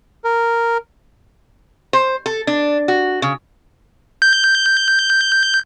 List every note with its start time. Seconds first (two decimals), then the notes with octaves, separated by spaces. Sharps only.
0.24 A#4
1.93 C5
2.26 A4
2.47 D4
2.88 F#4
3.22 C#3
4.22 G6